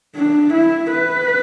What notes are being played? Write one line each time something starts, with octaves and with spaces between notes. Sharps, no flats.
D4
E4
B4